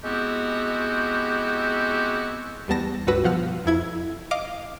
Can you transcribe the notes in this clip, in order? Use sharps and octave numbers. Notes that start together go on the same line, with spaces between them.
G#3 B3 C4 E4 F#4 G4
E2 G3 B3 A5 A#6
C#2 G2 F#4 B4 E6 A#6
B2 F3 F#5 F6
F2 E4 G#6
D#5 F5 D6